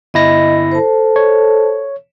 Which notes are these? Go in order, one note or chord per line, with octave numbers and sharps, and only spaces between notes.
G1 E4 D#5 A#6
A4 C5 A5
C#5